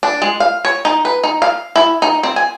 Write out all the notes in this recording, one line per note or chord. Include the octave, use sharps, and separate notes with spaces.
D4
G#3
F5
C#5
D#4
B4
D#4
F5
E4
D#4
C4
G#5